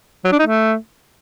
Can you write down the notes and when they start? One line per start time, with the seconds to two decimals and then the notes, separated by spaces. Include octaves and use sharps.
0.25 F#3
0.32 D4
0.39 D#4
0.47 A3